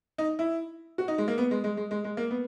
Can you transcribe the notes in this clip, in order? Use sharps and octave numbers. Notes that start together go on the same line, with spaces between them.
D#4
E4
F#4
D#4
G#3
A#3
B3
G#3
G#3
G#3
G#3
G#3
A#3
B3